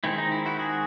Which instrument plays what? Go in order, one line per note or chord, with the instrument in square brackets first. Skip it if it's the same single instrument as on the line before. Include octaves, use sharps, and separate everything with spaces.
[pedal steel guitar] D#3 G#3 C4 E4
D#4
E4
E4 F#4
F#4 G#4